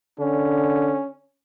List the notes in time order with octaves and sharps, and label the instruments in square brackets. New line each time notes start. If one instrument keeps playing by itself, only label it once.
[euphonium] D3 [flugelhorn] C#4